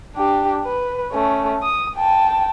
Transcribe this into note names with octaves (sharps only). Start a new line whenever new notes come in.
D4 G4
B4
A3 C#4
D#6
G5 A5